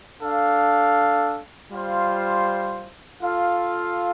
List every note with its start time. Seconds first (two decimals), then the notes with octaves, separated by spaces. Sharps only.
0.21 D4 A4 F5
1.71 G3 F4 C5 F5
3.21 F4 A4 F5